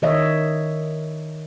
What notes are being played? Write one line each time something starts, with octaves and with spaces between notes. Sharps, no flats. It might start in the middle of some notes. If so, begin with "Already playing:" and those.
D#3 C#5 D#5 E5